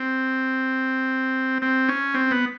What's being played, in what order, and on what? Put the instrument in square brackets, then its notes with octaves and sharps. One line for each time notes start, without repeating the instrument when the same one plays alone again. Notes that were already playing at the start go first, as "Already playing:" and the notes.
Already playing: [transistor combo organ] C4
C4
C#4
C4
B3